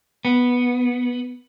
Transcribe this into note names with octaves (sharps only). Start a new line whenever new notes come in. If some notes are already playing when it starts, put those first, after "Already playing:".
B3